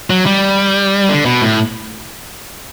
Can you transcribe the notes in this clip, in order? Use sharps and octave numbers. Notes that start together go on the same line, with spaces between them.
F#3
G3
D3
B2
A2